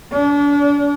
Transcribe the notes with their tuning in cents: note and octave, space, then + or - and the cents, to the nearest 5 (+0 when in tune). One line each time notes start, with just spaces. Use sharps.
D4 -35